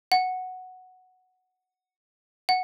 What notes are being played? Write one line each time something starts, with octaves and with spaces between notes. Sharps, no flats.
F#5
F#5